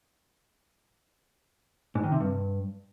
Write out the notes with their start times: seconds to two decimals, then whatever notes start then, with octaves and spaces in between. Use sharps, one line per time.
1.95 G#2
2.04 D#3
2.12 C3
2.20 G2